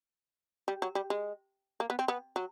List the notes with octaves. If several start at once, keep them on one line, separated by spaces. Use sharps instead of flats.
G3
F#3
G3
G#3
A#3
B3
C4
B3
F#3